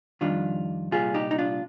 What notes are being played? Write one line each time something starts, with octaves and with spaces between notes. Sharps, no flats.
F2 D#3 G3 D4 F4
C2 A#2 G3 F4 G#4
D#4 G4
D#4
D4 F4